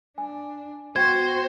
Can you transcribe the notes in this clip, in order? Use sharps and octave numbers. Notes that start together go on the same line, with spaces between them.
D4 G#5
B3 F#4 C5 G5 C6 G#6